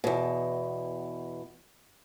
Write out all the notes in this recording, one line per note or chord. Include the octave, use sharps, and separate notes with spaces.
E2 B2